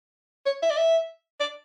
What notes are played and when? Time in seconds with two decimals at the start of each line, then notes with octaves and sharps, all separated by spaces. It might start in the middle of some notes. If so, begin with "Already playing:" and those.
0.46 C#5
0.62 E5
0.70 D5
0.77 E5
1.40 D5